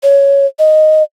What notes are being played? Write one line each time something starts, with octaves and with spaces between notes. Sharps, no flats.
C#5
D#5